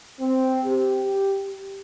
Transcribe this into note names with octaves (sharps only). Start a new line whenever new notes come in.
C4
G4